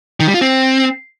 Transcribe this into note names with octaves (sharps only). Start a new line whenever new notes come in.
D#3
G3
F4
C4